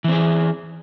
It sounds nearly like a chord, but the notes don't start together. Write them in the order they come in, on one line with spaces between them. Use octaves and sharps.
E3 C4 G#4